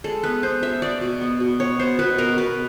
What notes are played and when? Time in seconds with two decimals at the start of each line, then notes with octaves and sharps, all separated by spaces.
0.04 G#3 A4
0.23 B3 B4
0.43 B3 C5
0.62 B3 E5
0.82 B3 D5
1.01 B2
1.21 B3
1.40 B2
1.60 B3 C#5
1.79 B3 C5
1.99 B2 B4
2.18 B2 A#4
2.38 B2 B4